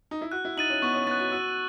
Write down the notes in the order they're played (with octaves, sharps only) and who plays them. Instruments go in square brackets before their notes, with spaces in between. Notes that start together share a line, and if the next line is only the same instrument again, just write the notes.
[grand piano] D#4
E4
[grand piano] F#4 [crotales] F#6
[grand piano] E4
[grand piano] D#4 [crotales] A6 D#7 F#7
[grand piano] C#4
[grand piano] B3 [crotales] C#6
[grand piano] C#4
[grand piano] B3 [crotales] F#6 A6
[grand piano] F#4
[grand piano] F#4 [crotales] E6